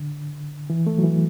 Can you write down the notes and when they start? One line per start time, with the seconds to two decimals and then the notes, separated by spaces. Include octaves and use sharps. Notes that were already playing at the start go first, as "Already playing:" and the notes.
Already playing: D3
0.70 E3
0.87 A3
0.98 F#3
1.03 E3